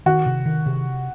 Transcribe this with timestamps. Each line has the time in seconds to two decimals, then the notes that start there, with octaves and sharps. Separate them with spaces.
0.06 D#3 F#4
0.26 C3
0.45 D#3
0.66 C3